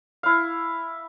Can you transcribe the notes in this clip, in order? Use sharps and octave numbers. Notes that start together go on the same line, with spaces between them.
E4 F5